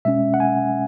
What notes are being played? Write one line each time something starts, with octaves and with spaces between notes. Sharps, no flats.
B2 G#3 C#4 E5
F#5
G#5